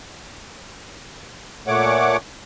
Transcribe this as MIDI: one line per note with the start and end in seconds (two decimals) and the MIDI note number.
1.67 2.17 46
1.67 2.17 57
1.67 2.17 73
1.67 2.17 78
1.67 2.17 86